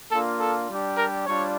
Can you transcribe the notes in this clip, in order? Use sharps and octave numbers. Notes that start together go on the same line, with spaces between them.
A#3 D4 F4 A4
A4
G3 D4 G4
A#4
G3 D4 F4 C#5